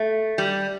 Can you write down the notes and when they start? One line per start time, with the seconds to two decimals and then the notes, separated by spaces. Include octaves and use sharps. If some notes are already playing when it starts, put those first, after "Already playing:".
Already playing: A3
0.38 G3